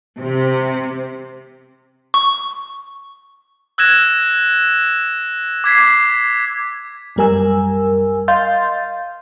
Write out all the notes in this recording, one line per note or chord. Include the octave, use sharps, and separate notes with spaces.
C3
C#6
E6 F#6 G#6 A#6 E7
D6 G#6 B6 C7
A1 F#2 G3 A#4 G#5 E6
D#5 F5 C6 G6 A6